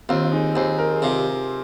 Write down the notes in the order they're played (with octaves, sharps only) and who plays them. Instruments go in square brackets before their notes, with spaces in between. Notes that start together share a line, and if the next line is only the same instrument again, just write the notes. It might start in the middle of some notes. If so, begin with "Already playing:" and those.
[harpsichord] D#2 [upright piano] C4 F4
[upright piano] F4
D#4 G#4
[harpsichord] D#2 [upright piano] G#4 C5
[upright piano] A#4
G#4
[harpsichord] C3 [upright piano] F4 A#4